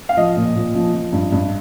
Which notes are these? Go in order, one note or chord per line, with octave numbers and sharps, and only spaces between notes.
F5
F3 D#5
A#2
A#2
F3
F3
G2
G2